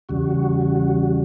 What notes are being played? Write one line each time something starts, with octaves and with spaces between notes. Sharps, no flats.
E2 C#3 G3 F#4